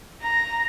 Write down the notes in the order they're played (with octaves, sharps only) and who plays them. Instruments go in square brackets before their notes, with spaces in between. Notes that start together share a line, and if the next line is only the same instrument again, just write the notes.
[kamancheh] A#5